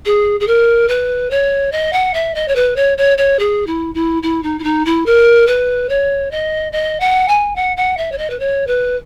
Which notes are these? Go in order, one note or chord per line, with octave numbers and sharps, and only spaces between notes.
G#4
G#4
A#4
B4
C#5
D#5
F#5
E5
D#5
C#5
B4
C#5
C#5
C#5
G#4
E4
E4
E4
D#4
E4
D#4
E4
A#4
B4
C#5
D#5
D#5
F#5
G#5
F#5
F#5
E5
C#5
D#5
B4
C#5
B4